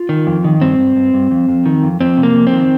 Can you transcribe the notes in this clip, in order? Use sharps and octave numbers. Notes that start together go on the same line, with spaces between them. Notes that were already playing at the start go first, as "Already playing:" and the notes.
Already playing: F4
D#3
F2
D#3
G2 C4
G2
G2
G2
F2
F2
D#3
F2
F2 C4
C3
A#3
F2
C4
D#3